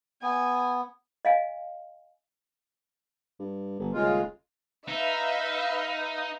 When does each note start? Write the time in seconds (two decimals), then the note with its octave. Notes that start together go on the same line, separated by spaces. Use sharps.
0.22 B3 G#5
1.25 D#5 F5 G#5
3.39 G2
3.79 G1
3.93 D#1 C#3 G#3 F4
4.88 D#4 B4 E5 F5